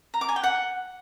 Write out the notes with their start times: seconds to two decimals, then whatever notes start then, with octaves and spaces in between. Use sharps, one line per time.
0.14 A#5
0.21 D6
0.29 G#5
0.36 G5
0.43 F#5